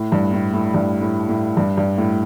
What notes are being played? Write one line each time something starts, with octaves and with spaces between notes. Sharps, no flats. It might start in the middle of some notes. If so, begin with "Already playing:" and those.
Already playing: A2
G2
A2
A2
G2
A2
A2
G2
G2
A2